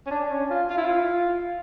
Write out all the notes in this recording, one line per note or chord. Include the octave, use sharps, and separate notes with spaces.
C#4
D4
C#4
F4
F4
E4
F4